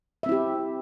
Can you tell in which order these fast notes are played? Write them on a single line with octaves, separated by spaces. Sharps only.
E5 C4 E4 G4